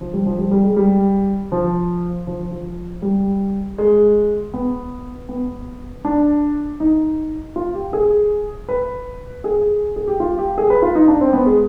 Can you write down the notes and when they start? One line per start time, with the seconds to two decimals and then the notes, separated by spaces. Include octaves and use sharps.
0.01 F3
0.13 G3
0.26 F3
0.38 G3
0.51 G3
0.63 G#3
0.76 G3
1.52 F3
2.27 F3
2.51 F3
3.02 G3
3.78 G#3
4.54 B3
5.29 B3
6.05 D4
6.80 D#4
7.56 F4
7.74 G4
7.93 G#4
8.69 B4
9.44 G#4
9.96 G#4
10.08 G4
10.20 F4
10.38 G4
10.58 G#4
10.70 B4
10.82 F4
10.95 D#4
11.08 D4
11.21 C4
11.33 B3
11.46 G#3